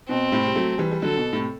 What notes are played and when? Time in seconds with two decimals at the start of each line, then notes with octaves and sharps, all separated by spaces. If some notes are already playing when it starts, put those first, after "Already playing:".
0.09 B2 C4
0.32 A2 C3
0.46 G3
0.55 F#3 A3
0.78 E3 G3
0.91 G3
1.02 D3 F#3 A4
1.17 B2
1.33 A2 C3